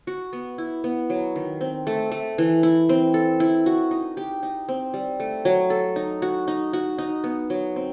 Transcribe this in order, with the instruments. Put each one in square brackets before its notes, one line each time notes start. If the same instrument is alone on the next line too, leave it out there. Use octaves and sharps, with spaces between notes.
[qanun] F#4
B3
E4
B3
F#3
D#3
C4
A3
A3
E3
E4
C4
A4
E4
F#4
D#4
G4
D#4
C4
G3
A3
F#3
A4
D#4
F#4
D#4
F#4
D#4
B3
F#3
C4